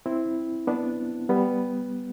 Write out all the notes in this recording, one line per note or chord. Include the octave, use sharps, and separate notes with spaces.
C4 E4
B3 D4
G3 B3